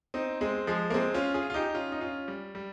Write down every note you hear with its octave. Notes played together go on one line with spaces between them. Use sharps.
C4 D#4
G#3 C4
F3 G#3
A#3
G#3 C4
C#4 F4
F4 G#4
F4
D#4 G4
C#4 F4
D#4
C#4 F4
G3
G3